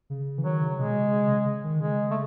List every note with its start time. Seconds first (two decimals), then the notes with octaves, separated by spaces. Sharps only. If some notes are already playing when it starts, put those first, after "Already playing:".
0.10 C#3
0.38 E3
0.44 D#3 F#3
0.62 C#3
0.78 B2 G#3
0.95 C#3
1.12 C#3
1.30 C#3
1.64 D#3
1.80 C#3 G#3
2.11 A3